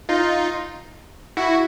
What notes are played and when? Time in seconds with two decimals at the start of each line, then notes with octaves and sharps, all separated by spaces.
0.09 D#4 F4
1.37 E4 F#4